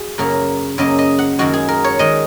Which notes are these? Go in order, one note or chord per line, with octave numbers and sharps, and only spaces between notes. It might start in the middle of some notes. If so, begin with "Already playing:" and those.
Already playing: F#4 G#4
F#2 C#3 A#3 A#4
F#2 C#3 A#3 D#5
D#5
F#5
F#2 D#3 G#3 F#4
G#4
A#4
C#5
D#3 G#3 D#5